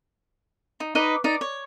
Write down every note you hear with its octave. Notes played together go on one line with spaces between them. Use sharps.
D#4
D#4 B4 D#5 D6
D#4 D5
C#5